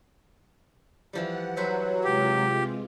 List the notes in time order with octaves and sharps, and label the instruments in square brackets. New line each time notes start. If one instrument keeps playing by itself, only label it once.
[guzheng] E3 F3 G3 [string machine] F#5
[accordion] F#3 [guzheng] B4 C5 E5
[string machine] C3 G#3 F4 [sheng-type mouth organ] G4